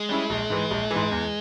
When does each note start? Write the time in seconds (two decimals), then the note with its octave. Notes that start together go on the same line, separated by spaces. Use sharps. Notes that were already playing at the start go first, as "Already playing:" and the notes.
Already playing: G#3
0.09 G3 C#4 E4
0.30 A#1
0.50 G#2 E3
0.71 A#1
0.91 G#2 E3
1.11 E2